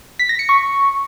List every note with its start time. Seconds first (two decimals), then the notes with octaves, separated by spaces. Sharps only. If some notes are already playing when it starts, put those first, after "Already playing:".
0.19 B6
0.29 A#6
0.39 C#7
0.49 C#6